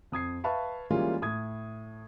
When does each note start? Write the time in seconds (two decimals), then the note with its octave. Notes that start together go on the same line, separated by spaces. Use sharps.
0.12 F2 D#6 G#6 C7
0.44 B4 E5 F5 A5 B5 C#6
0.90 E3 G3 G#3 A#3 C#4 F4
1.22 A2 D#6 G#6